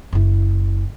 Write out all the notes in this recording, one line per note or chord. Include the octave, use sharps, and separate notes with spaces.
F#1 E4